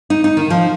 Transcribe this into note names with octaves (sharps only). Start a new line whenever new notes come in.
D#4
D#4
D#3
F3